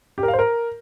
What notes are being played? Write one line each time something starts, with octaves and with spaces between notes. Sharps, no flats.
G4
A#4
F5
C5
A#4